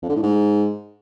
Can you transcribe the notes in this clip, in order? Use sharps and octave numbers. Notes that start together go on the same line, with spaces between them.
F2
D3
A2
G#2